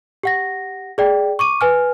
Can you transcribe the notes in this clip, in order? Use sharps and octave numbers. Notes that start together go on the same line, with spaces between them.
G4 F#5 A#6
G#4 D5 G5
C#6 D6 D#7
B4 G#5 F6